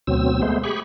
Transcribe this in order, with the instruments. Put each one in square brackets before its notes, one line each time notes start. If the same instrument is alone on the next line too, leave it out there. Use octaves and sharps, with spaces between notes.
[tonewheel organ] D2 B2 F#3 C4 E6
G#3 A3 B3 C5
G4 G#4 B5 C#6